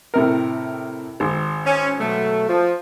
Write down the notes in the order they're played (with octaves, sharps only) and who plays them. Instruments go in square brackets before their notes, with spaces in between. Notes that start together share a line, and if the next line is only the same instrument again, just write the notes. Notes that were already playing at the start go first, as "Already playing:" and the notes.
[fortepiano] A2 C3 A#4
G#1
[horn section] C#4
B2 F#3 A3
F3